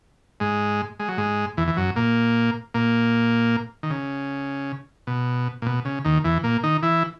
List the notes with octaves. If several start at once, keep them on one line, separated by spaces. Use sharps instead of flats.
G#2 G#3
G#3
F#3
G#2 G#3
E2 E3
E3
F#2 F#3
A#2 A#3
A#2 A#3
D#3
C#3
B2
A#2
B2
C#3
D#2 D#3
E2 E3
A#2 A#3
D#3 D#4
E3 E4